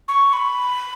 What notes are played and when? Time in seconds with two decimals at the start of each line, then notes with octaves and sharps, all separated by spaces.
0.08 C#6
0.33 B5